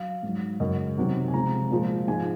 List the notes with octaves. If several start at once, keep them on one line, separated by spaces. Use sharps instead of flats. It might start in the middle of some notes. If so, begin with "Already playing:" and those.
Already playing: F#3 F5
G#2 F#3
F#2 C#3 G#3 D#5
C3 D#3 F#3
G#5
C3 F3 G#3 A#5
A#2 F3 G#3
G#2 F3 G#3 G#5